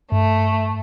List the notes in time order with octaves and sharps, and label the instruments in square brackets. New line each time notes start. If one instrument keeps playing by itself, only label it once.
[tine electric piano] G2 [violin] A3